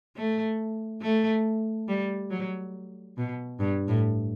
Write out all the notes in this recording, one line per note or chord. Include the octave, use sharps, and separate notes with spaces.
A3
A3
G3
F#3
B2
G2
A2